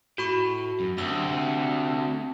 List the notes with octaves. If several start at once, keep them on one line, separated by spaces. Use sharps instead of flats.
A2 F#4 B5 C#6
F#2
D2 C4 G4 E6